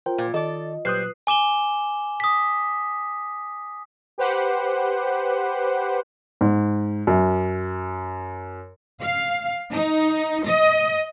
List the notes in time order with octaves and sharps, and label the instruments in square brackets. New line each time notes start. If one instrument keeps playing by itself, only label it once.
[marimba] F4 [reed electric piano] A#4 C5 G5
[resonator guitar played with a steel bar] A#2
[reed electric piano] D#3 [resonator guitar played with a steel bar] A4 D5 [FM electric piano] D#5
[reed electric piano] A#2 F#3 [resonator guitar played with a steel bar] G3 C5 [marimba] B4 [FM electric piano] D#6 F#6 C7
[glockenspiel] G#5 D6 E7 G7
D#6 B6
[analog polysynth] G4 B4 C5 F#5
[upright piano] G#2
F#2
[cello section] F5
D#4
D#5